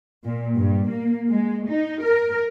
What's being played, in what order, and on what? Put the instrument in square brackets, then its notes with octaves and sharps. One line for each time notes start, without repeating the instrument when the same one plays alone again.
[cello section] A#2
G2
A#3
G#3
D#4
A#4